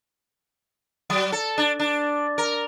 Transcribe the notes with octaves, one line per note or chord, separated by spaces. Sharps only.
F#3
A4
D4
D4
A#4